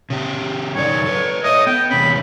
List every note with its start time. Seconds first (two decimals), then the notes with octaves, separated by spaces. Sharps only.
0.10 C#3 G4
0.75 F#2 D#3 C#5 D5
1.06 A4 B4
1.44 A4 C#5 D#5
1.67 B3 G5
1.91 E2 C3 C#4 B5